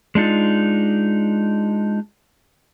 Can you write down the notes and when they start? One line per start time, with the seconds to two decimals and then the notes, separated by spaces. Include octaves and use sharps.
0.15 G#3 D4 D#4 F4